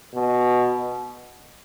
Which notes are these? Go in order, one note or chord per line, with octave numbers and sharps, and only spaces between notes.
B2